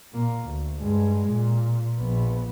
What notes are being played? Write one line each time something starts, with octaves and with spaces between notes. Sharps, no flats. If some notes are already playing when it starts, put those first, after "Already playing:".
A#2 A#3
D2
G2 G#3
A#2
A#1 B3